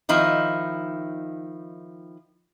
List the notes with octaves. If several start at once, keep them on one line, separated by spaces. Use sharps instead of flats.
D#3 F3 D#4 E4